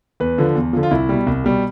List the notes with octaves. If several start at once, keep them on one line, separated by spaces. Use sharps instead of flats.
E2 B4
D3 F3
E2
D3 F3
F4
C2 E4
B2 G3
C2
B2 G3